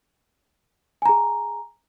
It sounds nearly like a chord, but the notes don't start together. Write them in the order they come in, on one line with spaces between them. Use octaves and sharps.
G#5 A#5 G#4